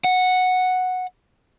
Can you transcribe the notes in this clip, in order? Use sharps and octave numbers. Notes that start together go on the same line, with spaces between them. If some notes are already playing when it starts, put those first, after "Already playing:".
F#5